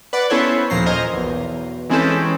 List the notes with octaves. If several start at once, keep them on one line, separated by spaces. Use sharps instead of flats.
B4 D5 F#5
B3 C#4 E4 A4 C5 C#5
D#2 A#2 F3 A#5 C7
A#4 C5 D#5 G#5
B1 E2
E3 G#3 C4 C#4 E4 A4